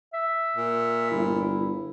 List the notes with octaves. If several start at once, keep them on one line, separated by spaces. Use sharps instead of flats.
E5
A#2
G1 E4